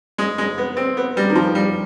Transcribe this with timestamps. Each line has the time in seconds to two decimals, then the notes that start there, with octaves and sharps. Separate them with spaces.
0.18 G#3
0.38 G#3
0.58 B3
0.77 C4
0.97 B3
1.17 G3
1.29 D#3
1.35 F3
1.55 G3